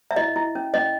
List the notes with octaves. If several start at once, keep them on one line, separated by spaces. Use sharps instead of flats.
E5
E4 D#5
E4
C#4
C#4 D#5